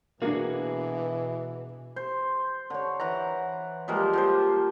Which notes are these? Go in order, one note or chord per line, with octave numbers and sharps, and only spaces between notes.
B2 E3 A#3 D4 F#4 G#4
C5
D3 C#5
E3 F#5 A#5
F3 G3 G#3 A#3
F3 G4 C5